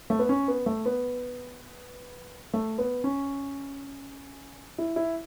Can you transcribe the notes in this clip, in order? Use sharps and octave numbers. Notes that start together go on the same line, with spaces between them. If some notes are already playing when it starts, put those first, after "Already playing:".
A3
B3
C#4
B3
A3
B3
A3
B3
C#4
E4
E4